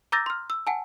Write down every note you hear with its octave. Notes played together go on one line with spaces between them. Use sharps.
A#5 D6 E6 G6 A6 A#6
C6 F6
E6
F#5 G#5 A5